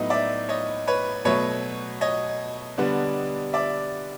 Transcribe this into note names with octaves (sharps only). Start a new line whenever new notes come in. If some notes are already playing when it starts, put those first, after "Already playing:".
Already playing: A2 F#3 B3 D#4 D#5
D5 E5
C#5 D#5
B4 C#5
B2 F#3 A3 B4 C#5
C#5 D#5
D3 G3 B3 D4
D5 E5